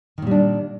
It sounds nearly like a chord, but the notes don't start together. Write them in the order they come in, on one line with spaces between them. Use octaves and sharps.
D#3 A#2 G3 D4